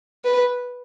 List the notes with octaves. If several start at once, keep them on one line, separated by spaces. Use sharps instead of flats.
B4